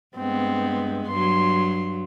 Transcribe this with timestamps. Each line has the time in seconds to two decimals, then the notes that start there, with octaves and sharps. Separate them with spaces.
0.16 G2 G#3 B3 C4
1.08 G2 F#3 C6